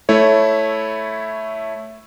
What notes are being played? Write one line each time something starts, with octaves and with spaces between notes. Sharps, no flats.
A3 E4 C#5